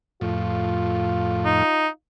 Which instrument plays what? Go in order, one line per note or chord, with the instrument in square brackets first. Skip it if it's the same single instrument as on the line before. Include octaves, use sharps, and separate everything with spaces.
[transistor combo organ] F2 A2 [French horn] F4
[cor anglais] D#4